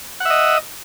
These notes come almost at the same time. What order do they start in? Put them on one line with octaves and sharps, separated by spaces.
F#5 E5 D#5